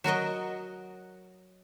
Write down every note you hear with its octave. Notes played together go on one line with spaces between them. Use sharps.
F#3 F#4 A#4 D#5